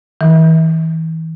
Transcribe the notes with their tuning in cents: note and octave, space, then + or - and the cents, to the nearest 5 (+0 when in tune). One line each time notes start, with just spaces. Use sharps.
E3 -35